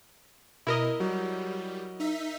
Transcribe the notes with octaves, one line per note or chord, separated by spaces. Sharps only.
B2 E4 A#4 D#5
F#3 G3
D#4 E5 B6